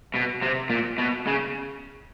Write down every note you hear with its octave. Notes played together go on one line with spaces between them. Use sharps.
B2
C3
A#2
B2
C#3